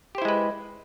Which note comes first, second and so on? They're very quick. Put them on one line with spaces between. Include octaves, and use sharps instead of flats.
G4 C5 E4 G#3 B4